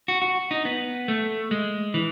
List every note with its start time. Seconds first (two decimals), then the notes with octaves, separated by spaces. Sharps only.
0.08 F#4
0.22 F#4
0.51 D#4
0.65 B3
1.08 A3
1.51 G#3
1.94 E3